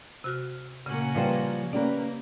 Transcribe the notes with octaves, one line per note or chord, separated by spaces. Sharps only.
C3 F#4 F6
A#2 C#3 A#3 C#4 F#4
F3 G3 B4 C5 G5
A#3 C#4 G4 B4 D5